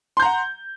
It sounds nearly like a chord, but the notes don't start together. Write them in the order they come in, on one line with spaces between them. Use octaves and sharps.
C6 G6 A#5 F#5